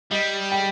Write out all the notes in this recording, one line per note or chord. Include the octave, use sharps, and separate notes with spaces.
G3 D#5
G5